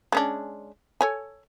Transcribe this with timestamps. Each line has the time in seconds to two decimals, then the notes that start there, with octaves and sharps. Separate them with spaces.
0.12 G#3 C#4 D4
1.01 A4 C#5 G#5